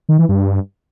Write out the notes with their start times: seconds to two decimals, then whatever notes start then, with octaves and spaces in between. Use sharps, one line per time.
0.09 D#3
0.19 E3
0.29 G2